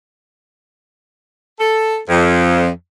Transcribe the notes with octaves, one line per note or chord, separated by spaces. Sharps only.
A4
F2